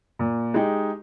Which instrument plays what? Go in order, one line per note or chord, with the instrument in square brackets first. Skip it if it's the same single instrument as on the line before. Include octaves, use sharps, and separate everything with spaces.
[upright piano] A#2
G#3 D#4 G4